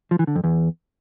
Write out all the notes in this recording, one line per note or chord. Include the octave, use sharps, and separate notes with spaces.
F3
E3
D3
F2
E2